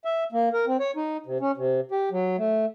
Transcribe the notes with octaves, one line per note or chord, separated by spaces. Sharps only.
E5
A#3
A#4
C4
C#5
D#4
C3
C#4
C3
G4
F#3
A3